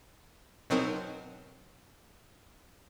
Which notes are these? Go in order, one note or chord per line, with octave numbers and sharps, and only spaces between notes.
B2 F#3 C4 D#4 A#4